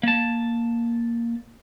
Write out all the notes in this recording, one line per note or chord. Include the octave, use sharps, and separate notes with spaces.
A#3 A5